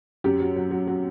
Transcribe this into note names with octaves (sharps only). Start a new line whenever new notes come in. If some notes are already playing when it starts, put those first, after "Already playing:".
F#2 G4
F#3
F#3
F#3
F#3